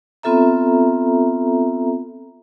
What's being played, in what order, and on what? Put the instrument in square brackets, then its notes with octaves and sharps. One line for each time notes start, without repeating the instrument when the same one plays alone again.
[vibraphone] B3 C4 F4 A4 E5 A#5